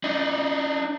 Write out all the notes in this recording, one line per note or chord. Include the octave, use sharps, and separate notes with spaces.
D4 D#4